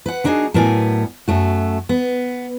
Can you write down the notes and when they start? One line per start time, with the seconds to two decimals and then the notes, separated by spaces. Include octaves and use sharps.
0.06 B4 F#5
0.24 A#3 D4 D#4 F#4 G#4
0.54 A2 F#3 B3 A#4 D5 G#5
1.28 F#2 A3 F#4
1.89 B3